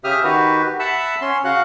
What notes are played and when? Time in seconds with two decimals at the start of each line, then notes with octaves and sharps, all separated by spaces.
0.04 C#3 G4 E5 D#6 F6
0.24 D#3 F#4 G4 B4
0.79 E5 F#5 A5 B5 E6 F#6
1.21 C#4 C6
1.45 C#3 F#4 F5 F#5 F#6